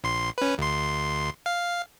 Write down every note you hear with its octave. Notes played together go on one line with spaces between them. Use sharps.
A#1 C6
C#4 B4
D2 C6
F5